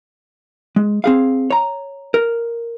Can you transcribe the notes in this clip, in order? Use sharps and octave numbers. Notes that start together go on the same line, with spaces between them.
G#3
C4 G#4 F5
C#5 A#5
A#4